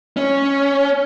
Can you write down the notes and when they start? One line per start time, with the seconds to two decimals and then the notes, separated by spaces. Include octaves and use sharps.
0.17 C#4